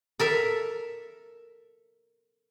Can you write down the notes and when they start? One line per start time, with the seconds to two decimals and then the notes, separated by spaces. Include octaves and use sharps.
0.19 A4 A#4 E5